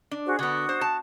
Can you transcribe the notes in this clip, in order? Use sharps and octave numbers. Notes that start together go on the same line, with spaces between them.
D4
F#4 G#4 C5
D3 B3 F#4 D#6
C5
A5